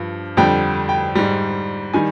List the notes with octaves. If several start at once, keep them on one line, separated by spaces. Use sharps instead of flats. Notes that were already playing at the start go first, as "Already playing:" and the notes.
Already playing: G2 F3
F2 D3 G3 G5
G5
G#2 G3
D#3 G3 G#5